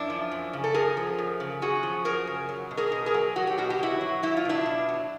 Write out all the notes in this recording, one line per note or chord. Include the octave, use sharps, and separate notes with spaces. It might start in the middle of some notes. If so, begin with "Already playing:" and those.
Already playing: F#2 D4 E4
F3
F#2
C#3
A4
F#2 G#4 A#4
F3
F#2
C#3
F#2 F#4 G#4
F3
F#2 G#4 A#4
C#3
F#3
B2
G#4 A#4
B2
G#4 A#4
F#3
F#3 F#4
G4
B2 F#4
G4
B2 E4 F#4
F#3
F#3 E4
F4
B2 D4 E4
B2
F#3